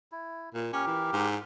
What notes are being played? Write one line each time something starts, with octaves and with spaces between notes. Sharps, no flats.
E4
A#2
C#4 G4 A#4
E3
G#2